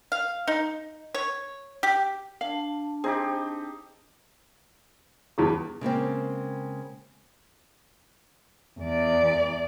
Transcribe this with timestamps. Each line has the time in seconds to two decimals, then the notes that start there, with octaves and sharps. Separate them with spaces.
0.12 F5
0.48 D#4
1.15 C#5
1.83 G4
2.41 D4 F5 A5
3.04 C4 D#4 G4 G#4
5.38 E2 G2 G#4
5.81 C#3 G#3 A#3 C4
8.81 E2 D5